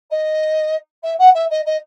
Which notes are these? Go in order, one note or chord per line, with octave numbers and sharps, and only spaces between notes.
D#5
E5
F#5
E5
D#5
D#5